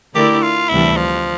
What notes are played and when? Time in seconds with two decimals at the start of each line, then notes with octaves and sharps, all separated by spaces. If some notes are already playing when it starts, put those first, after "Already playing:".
0.15 D3 A3 E4 G4 A#4 D5
0.43 F4
0.69 D2 C3 E3 G3 D4 E4
0.97 F3